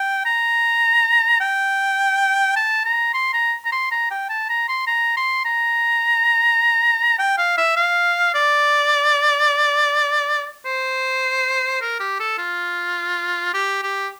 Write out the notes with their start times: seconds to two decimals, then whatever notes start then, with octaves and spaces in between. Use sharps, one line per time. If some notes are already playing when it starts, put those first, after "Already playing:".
Already playing: G5
0.25 A#5
1.40 G5
2.56 A5
2.85 A#5
3.14 C6
3.33 A#5
3.65 A#5
3.72 C6
3.92 A#5
4.11 G5
4.30 A5
4.49 A#5
4.68 C6
4.87 A#5
5.17 C6
5.45 A#5
7.19 G5
7.38 F5
7.57 E5
7.76 F5
8.34 D5
10.65 C5
11.81 A#4
12.00 G4
12.20 A4
12.38 F4
13.54 G4
13.83 G4